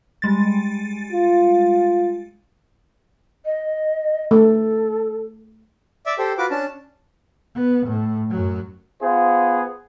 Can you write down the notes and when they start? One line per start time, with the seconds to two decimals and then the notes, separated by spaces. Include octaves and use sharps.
0.22 G3 G#3 A6
1.12 F4
3.45 D#5
4.31 A3 A4
6.06 D5 E5
6.18 G4 A4 C5
6.38 F4 F#4 B4 D6
6.51 C#4 D4 A5
7.55 B3
7.86 A2
8.30 F#2 F#3
9.02 B3 F4 G#4 C5